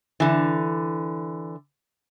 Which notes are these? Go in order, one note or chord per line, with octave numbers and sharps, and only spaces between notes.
D3 E3